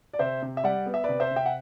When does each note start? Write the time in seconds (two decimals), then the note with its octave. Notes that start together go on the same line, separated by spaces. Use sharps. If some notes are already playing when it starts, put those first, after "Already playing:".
0.13 D5
0.19 C3 C5 E5
0.42 C3
0.57 E5
0.64 G3 D5 F#5
0.86 B3
0.94 E5
1.04 C3 B4 D5
1.20 C5 E5
1.31 C3
1.36 E5 G5
1.46 F#5